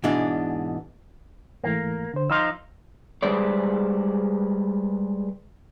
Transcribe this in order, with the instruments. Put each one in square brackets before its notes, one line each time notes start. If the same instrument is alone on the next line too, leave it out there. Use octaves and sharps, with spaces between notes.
[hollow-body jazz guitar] G#2 B2 E3 G#3 D4
[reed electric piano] G#2 E3 A3 [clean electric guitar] A#3
[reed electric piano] D3 C5
[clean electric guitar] F3 D#4 F4 [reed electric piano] C6 E6
[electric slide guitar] G3 G#3 G#4 B4 C5 D5